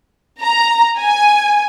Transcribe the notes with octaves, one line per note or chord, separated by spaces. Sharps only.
A#5
G#5